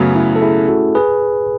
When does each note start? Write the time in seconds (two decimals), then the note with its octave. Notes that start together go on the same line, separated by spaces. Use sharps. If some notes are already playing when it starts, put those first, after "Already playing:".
Already playing: F#2 C#3 F#3 A3 B3
0.15 C#4 E4
0.36 A4
0.42 E4 G#4
0.69 F#4 A4
0.95 G#4 B4